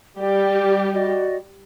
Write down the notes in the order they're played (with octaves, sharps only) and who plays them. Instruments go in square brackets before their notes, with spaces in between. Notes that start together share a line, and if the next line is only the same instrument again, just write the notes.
[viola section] G3 G4 [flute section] D5 G5
[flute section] F#4 D5 D#5